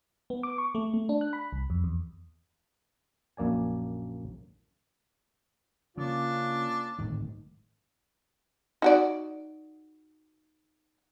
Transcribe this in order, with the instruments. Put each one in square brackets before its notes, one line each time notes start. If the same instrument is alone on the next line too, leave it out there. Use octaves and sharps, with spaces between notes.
[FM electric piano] B3
D6
C#6
A3
A3
D4
F#6
B5
C2
F2
E2
[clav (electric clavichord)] A#1 F#2 A#3 D5 G#5
[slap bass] C#3 [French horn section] A#3 C#4 F4 [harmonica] D4
[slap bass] D1 G#1 D#3
[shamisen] D#4 F#4 D5